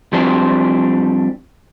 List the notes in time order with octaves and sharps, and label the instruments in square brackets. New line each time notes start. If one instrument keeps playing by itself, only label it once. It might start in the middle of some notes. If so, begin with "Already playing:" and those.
[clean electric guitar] F3 G3 C4 D4 G4 C5